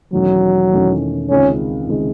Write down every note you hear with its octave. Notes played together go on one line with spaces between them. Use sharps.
E1 E2 D#3 F#3 A3 C#4
E1 E2 D#3 A3 C#4
C#2 C3 D#3 G#3 C#4
C#2 C3 D#3 G#3